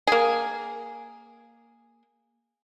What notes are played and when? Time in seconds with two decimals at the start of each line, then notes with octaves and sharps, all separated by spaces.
0.07 A#3 G#4